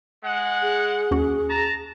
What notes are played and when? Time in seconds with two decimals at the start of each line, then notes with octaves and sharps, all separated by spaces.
0.24 G#3 F#5
0.62 G#4
1.11 D#2 C#4 F#4
1.49 A5 A#5